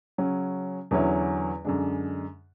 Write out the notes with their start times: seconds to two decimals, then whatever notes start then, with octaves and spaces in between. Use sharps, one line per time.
0.18 C#3 F#3 C#4
0.91 E2 D3 F#3 C#4 E4
1.65 F#2 D3 G#3 D4